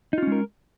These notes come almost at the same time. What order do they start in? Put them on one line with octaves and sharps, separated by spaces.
D#4 F4 C#4 G#3 A#4